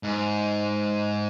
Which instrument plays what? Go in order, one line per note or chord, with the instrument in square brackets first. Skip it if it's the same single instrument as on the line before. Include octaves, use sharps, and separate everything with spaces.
[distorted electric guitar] G#2